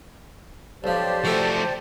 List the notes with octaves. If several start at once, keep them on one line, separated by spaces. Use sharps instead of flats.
B1 F3 G4 C5 D5 A5
F3 A3 F#4 A4